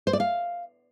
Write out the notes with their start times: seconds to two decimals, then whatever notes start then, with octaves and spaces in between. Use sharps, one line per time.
0.07 C5
0.13 D5
0.20 F5